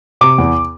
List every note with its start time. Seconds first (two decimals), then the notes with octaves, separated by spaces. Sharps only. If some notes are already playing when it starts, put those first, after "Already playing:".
0.21 C3 D6
0.38 E2